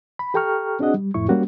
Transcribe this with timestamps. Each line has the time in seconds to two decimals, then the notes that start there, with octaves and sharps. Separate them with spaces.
0.19 B5
0.34 G4 A4 G5 A#5 C#6 F6
0.80 C4 D4 F#4 G#4 D#5 F#5
0.94 G3
1.14 F2 A2 E4 C#6
1.28 G3 A#3 C#4 F#4 G4